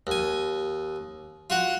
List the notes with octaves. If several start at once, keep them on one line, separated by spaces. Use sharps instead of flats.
D#2 G#5
F4 F#4 F#5